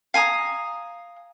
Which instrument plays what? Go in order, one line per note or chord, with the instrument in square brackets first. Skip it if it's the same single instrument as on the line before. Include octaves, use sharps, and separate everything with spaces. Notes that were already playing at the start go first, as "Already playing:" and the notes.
[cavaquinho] F5 G#5 A#5 D#6